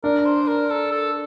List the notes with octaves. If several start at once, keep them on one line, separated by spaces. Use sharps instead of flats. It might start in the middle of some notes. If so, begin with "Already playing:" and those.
D4 A#4
C5
A#4
A4
A4